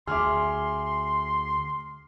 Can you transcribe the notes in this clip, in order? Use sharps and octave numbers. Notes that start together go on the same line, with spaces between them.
D2 G#4 E5 C6 D6 F6